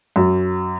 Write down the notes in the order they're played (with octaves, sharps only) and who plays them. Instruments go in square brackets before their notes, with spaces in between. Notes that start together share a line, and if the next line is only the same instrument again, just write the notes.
[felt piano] F#2